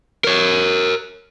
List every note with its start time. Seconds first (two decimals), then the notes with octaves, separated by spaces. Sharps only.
0.24 A#4 C#5